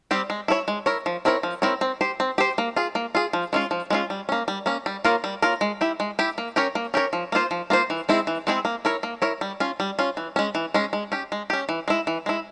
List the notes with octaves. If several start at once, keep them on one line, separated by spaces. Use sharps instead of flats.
G3 C4 G4
G#3
E4 A#4 C#5
G#3
E4 A#4 C#5
F3
C4 E4 A#4 C#5
F3
C4 E4 A#4 C#5
C4
G4 C5
C4
G4 C5
A#3
F4 G#4
A#3
F4 G#4
F3
G#3 C#4 F4
F3
G#3 C#4 F4
G3
A#3 C#4
G3
A#3 C#4
G3
A#3 F4 A#4 C#5
G3
A#3 F4 A#4 C#5
G#3
E4 G4
G#3
E4 G4
A#3
C#4 G4 A#4 C#5
A#3
C#4 G4 A#4 C#5
F3
A#3 F4 C5
F3
A#3 F4 C5
E3
G#3 C4 E4 G#4
E3
G#3 C4 E4 G#4
A#3
E4 A#4 C#5
A#3
E4 A#4 C#5
G3
C#4 F4
G3
C#4 F4
E3
G#3 C#4
E3
G#3 C#4
G#3
C#4 G4
G#3
C#4 G4
E3
G#3 E4
E3
G#3 E4